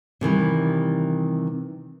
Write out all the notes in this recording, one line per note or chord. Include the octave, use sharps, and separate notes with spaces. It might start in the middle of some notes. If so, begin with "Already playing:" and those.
C3 D#3 E3 G3